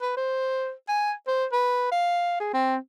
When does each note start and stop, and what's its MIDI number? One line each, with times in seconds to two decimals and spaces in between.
0.01 0.13 71
0.17 0.72 72
0.88 1.12 80
1.27 1.45 72
1.52 1.88 71
1.91 2.35 77
2.40 2.52 68
2.53 2.76 60